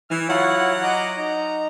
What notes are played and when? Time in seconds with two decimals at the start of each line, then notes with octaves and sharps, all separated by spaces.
0.10 E3 F6
0.29 F#3 E4 F4 C#5 F#5
0.83 D#5 A#5 D6
1.18 D#4 A#5